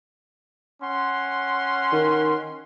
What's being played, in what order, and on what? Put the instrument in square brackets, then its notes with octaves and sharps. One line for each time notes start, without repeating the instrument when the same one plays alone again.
[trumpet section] C#4 F#5 C6
[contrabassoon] D#3